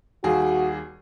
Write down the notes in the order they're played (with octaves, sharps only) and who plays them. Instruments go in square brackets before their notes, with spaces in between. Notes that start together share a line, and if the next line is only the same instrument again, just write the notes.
[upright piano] D#2 G3 G#4 [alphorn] F#4